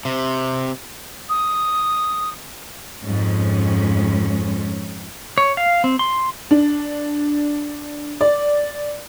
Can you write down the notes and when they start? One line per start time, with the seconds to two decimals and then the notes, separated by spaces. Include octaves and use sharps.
0.05 C3
1.29 D#6
3.01 F2 G#2 C#4
5.38 C#5
5.57 F5
5.84 C4
5.99 C6
6.51 D4
8.21 D5